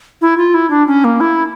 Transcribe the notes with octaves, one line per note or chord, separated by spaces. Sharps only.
E4
F4
E4
D4
C#4
A#3
E4